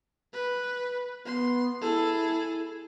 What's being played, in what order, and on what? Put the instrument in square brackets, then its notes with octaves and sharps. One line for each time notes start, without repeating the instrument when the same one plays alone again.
[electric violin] B4
[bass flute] B3 [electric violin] C6
[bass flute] E4 [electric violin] G#4 A4